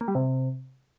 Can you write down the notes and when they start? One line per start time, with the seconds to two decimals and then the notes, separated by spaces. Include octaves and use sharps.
0.01 A#3
0.08 G3
0.15 C3